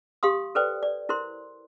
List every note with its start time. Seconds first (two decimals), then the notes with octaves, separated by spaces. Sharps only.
0.23 G4 F5 C6 D#6
0.55 A4 B4 C5 D5 G5
0.83 D5
1.09 E4 A#4 C5 C6